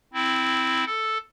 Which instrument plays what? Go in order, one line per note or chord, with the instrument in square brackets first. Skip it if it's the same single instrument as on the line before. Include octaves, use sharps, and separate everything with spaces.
[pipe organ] C4 E4
A4